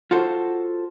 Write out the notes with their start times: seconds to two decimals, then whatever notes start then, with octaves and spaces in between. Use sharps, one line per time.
0.11 F4 F#4 A4 C5